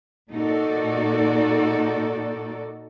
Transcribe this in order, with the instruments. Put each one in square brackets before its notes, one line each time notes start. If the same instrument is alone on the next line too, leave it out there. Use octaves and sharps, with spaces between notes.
[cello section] A#2 D#4 F#4 A4 D5